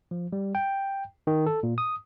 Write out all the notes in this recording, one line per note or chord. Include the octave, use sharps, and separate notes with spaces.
F3
G3
G5
D#3
A4
A#2
D#6